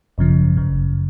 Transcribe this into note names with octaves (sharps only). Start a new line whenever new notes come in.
G#1 F#2 C#3 F3
G1 F#2 C#3